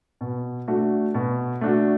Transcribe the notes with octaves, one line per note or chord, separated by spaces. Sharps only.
B2
A3 D4 F#4
B2
A3 D4 F#4